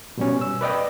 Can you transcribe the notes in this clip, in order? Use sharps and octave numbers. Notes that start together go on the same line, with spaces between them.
B2 G3 C#4
E6
B4 D5 D#5 G5